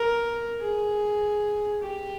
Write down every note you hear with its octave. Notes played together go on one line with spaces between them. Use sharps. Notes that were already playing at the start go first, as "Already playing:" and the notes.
Already playing: A#4
G#4
G4